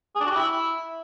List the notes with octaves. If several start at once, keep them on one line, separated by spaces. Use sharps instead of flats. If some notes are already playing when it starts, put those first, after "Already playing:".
G#4
D4
F#4
G4
E4